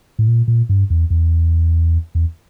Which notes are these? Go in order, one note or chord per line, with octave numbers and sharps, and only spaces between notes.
A2
A#2
A#2
G2
E2
E2
E2